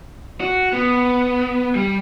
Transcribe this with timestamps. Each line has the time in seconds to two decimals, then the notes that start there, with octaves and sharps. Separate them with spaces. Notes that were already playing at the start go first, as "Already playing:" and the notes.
0.41 F#4
0.73 B3
1.75 G3